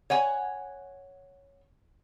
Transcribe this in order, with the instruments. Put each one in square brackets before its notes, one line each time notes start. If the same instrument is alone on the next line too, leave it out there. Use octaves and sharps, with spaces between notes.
[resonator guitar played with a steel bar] C#5 F#5 G#5